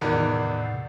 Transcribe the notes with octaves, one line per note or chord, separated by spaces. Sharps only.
E2 A2 C3 D#3 D5 F#5